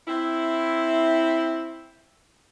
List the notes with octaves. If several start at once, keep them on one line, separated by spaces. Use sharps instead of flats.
C4 E4